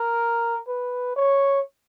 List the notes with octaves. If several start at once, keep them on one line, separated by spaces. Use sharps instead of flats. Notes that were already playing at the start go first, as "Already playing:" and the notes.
Already playing: A#4
B4
C#5